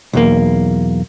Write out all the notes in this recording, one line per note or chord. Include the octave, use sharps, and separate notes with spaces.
B1 E2 A#3